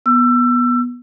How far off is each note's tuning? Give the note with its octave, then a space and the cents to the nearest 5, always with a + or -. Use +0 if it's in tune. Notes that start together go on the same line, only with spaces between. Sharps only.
B3 -15 E6 +25